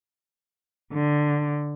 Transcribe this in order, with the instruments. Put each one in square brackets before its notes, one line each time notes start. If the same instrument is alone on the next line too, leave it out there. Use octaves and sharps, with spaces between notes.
[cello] D3